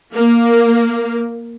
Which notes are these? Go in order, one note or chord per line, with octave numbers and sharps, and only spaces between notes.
A#3